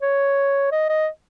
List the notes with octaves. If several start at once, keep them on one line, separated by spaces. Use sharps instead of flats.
C#5
D#5
D#5